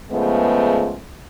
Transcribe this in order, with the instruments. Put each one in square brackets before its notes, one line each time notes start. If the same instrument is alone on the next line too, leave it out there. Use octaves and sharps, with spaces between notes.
[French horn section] C#3 F3 G#3 A3 B3